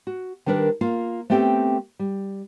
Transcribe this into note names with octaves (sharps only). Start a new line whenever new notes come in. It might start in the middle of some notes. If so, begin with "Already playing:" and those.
F#4
D#3 G3 D4 A#4 B4
A#3 F4 F5
A3 B3 C4 G4 A4 G5
G3